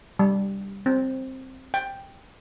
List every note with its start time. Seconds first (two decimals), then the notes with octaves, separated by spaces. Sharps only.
0.19 G3
0.86 C4
1.74 G5